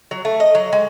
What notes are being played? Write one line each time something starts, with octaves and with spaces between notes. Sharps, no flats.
F#3
A3
D#5
F#3
G#3